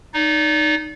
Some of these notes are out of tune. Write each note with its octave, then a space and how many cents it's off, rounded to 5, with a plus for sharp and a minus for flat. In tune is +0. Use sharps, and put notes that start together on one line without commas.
D#4 -15 D5 -30